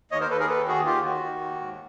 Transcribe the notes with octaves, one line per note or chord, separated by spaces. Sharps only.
D#2 C#5 D#5
A#4 C5
D#2 A4 B4
G#4 A#4
D#3 A4 B4
D#2 F#4 G#4
D#3 F4 G4
D#3 F#4
D#3
D#2
G#2